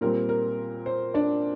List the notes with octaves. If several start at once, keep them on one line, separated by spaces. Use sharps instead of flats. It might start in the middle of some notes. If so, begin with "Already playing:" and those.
A#2 G3 C4 A#4
A#4
C5
D4 D5